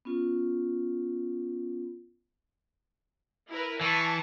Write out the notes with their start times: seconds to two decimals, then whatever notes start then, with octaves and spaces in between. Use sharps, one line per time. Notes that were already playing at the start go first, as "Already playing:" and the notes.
0.05 B3 C#4 F4
3.50 E4 A#4 B4
3.81 E3 A5 C#6